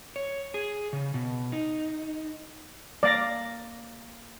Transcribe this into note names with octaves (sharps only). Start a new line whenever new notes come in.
C#5
G#4
C#3
B2
D#4
A#3 D5 F5 A#6